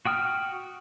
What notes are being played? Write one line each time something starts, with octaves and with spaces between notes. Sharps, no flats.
F#4 G5 D#6 F6